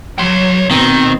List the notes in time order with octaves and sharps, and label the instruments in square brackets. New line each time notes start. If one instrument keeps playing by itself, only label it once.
[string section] F#3 [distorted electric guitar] C#5 C6
[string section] B2 [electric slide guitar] D#3 [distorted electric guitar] C4